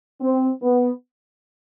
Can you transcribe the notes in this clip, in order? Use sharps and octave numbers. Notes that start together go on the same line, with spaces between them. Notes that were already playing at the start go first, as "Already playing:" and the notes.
C4
B3